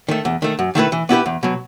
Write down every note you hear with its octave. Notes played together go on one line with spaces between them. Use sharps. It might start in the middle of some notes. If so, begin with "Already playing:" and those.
D#3 A3
E2
D#3 A3
F#2
D#3 A3 E4 B4
E3
B3 E4 G4 B4
E2
B2 F#3